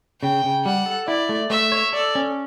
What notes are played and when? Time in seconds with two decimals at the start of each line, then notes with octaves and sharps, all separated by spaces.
0.22 C#3 G5
0.44 C#3
0.65 G3 F#5
0.86 A4
1.08 E4 D5
1.29 A3
1.50 A3 E5
1.72 C#5
1.93 A4 D5
2.15 C#4